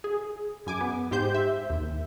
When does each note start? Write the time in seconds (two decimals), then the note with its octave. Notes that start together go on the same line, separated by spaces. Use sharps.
0.04 G#4
0.66 F#2 G#5 D6
0.80 B3
1.11 G#2 G4 C5 G6
1.34 E5
1.70 D#2